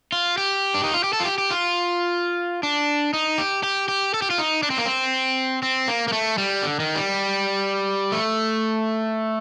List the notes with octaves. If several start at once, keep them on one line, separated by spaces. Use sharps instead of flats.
F4
G4
D4
D#4
F4
G4
A4
F4
G4
G4
F4
D4
D#4
G4
G4
G4
A4
G4
F4
D#4
D4
C4
A#3
C4
C4
A#3
A#3
A3
G3
D3
D#3
G3
A3